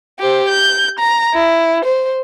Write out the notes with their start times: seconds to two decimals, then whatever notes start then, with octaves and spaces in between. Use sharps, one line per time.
0.19 G4 C5
0.48 G6
0.99 A#5
1.34 E4
1.85 C5